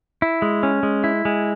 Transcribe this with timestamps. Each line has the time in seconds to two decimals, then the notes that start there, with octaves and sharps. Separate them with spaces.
0.22 E4
0.42 G#3
0.63 C#4
0.83 G#3
1.04 E4
1.25 G#3